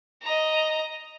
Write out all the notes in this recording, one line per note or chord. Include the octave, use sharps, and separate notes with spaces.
D#5 A#5